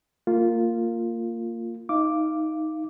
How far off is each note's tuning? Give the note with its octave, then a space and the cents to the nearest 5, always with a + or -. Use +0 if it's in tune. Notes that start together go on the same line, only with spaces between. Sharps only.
A#3 -20 F4 +0
D#4 +10 F5 -20 D6 +0